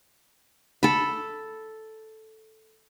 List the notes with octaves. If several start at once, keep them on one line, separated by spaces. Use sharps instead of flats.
A4 B5